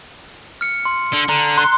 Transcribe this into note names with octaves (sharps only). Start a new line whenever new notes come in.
F6 C#7
C6
D3
D3 A#5
C6 F#6